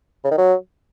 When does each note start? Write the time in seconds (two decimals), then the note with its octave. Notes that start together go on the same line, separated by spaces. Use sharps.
0.25 C#3
0.31 D#3
0.38 F#3